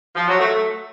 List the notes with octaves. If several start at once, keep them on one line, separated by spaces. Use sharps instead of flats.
F3
F#3
A3